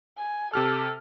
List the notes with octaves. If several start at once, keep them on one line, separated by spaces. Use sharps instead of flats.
G#5
C3 G4 A4 F6